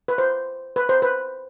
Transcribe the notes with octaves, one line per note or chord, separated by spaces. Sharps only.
B4
C5
B4
C5
B4